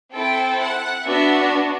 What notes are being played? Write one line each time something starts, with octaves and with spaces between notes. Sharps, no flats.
C4 E4 A4 G5
F#5
B3 D4 F#4 E5